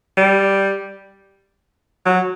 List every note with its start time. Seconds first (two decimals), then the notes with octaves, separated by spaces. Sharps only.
0.17 G3
2.06 F#3